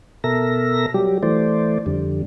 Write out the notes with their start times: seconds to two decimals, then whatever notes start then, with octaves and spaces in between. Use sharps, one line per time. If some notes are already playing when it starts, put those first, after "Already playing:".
0.24 B2 A4 A#4 E5 A#6
0.94 F#3 G3 G4
1.23 E3 A3 C5 D5
1.86 F2 D3 G3